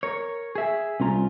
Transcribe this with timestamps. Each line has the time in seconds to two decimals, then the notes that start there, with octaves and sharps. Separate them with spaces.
0.03 A#4 C#5
0.55 G#4 E5
1.00 C2 C#4 F4 A#5